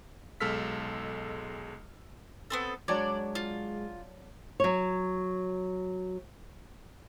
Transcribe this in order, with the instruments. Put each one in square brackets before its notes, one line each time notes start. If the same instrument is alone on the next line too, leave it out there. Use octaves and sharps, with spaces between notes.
[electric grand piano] B1 G#3 A4 E6 F6 B6
[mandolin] B3 C4 A4
[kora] F#3 D4 C#5 [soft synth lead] G#3 [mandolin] D5
[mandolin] F4
[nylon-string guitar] F#3 C#5